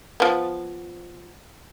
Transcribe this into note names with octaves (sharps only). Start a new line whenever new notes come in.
F3 B3